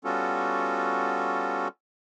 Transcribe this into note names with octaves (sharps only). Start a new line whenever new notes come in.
G3 B3 C#4 F4 F#4 A4